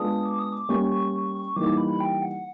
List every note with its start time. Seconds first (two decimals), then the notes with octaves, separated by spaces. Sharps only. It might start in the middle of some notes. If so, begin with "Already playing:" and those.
Already playing: G#3 B3 D4 F4 G#4 D#6
0.25 D6
0.39 D#6
0.52 D6
0.69 G3 A#3 C#4 C#6
0.91 C#6
1.13 C#6
1.35 C#6
1.56 E3 G3 A#3 D#4 G4 D6
1.78 B5
2.00 G5
2.22 F#5